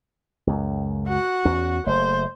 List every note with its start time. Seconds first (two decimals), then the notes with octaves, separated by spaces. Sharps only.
0.47 C#2 F#2
1.07 F#4 F#5
1.45 E2 C#4
1.87 F#1 A3 C5